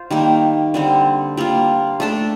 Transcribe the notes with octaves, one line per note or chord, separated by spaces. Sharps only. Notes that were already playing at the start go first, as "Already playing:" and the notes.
Already playing: F4 C5
D#3 G3 A#3
D3 G3 C4
G3 A#3 F4
A3 D4 A4